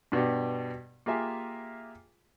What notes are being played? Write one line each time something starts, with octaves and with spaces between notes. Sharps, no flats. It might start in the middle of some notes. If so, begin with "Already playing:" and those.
G2 B2 B3 D4 G4
A#3 F4 G4 G#4 E5 G#5